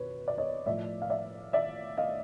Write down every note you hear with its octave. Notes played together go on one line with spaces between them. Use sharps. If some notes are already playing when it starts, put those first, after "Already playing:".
Already playing: B2 B4 C#5
D5
C#5 D#5
A2 F3 D5 E5
F5
D5 E5
D5 E5
D#5 F5